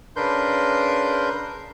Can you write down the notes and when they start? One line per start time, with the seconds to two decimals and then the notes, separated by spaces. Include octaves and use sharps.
0.16 C#3 D4 A#4 B4 C6 G6